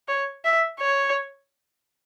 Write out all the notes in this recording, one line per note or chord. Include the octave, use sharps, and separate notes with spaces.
C#5
E5
C#5